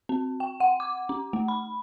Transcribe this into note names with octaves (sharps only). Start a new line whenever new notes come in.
C4
G5
F#5
D6
C#4
A3
B5